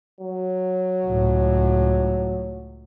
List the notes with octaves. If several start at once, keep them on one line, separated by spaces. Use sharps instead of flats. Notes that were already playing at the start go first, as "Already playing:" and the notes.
F#3
C#2 A2